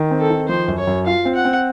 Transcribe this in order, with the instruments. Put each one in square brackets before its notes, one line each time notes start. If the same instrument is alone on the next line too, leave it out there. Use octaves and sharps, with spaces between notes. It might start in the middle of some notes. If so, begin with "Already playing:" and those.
Already playing: [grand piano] D#3
C4
[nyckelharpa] A4
[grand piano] D#3
[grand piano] F3 [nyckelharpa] C5
[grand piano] F#2
[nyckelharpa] C#5
[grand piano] F#2
[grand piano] F4 [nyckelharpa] F5
[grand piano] C4
[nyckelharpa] F#5
[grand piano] C4